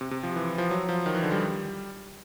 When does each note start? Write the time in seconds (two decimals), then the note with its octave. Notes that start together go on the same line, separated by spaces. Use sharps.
0.01 C3
0.11 C3
0.23 F3
0.36 E3
0.58 F3
0.71 F#3
0.89 F3
1.06 D#3
1.15 E3
1.23 D3
1.32 G3